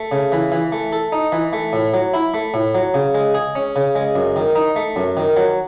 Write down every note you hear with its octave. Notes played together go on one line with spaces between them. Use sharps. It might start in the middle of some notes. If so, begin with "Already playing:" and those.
Already playing: A3
C#3
E3
E3
A3
A4
D#4
E3
A3
A2
F#3
E4
A3
A2
F#3
C#3
G#3
G#4
C#4
C#3
G#3
F#2
D#3
D#4
A3
F#2
D#3
F#3